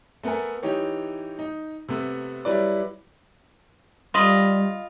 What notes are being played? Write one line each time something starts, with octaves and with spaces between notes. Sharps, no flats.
A3 B3 A4 A#4 G#5
E3 D#4 G4 C#5
D#4
C3 A3 B3
F#3 G3 E4 B4 D5
G3 F4 D#5 B5